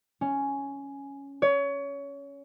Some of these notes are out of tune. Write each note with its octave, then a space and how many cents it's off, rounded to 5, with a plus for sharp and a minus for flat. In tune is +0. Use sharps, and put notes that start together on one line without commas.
C#4 +5
C#5 +25